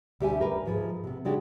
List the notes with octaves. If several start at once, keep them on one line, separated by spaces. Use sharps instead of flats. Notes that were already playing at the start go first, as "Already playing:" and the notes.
D2 G3 G4 D#5 E5 G#5
G4 A#4 B4
G#2 F3 G#4
C3 B3
C#3 G#3 D4 F#4 G4